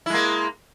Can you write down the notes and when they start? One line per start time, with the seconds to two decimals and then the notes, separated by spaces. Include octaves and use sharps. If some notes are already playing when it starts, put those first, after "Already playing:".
0.06 E4
0.10 G#3
0.14 A#3